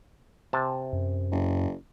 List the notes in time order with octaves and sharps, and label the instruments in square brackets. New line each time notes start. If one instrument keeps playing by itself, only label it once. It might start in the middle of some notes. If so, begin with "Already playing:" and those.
[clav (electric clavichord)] C3 A5
[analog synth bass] F#2
[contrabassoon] F#1